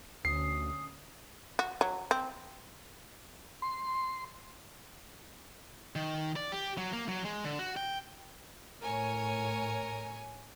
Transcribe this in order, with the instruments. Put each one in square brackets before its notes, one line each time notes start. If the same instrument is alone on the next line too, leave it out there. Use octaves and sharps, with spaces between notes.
[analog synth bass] D2 [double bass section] D3 C#4 [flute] D#6 [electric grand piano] C7
[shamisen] F#4
F#3
C4
[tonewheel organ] C6
[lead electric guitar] D#3
D5
G4
F#3
A#3
F#3
G#3
D3
F#4
G5
[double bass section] A2 [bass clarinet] A#4 [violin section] C#5 G#5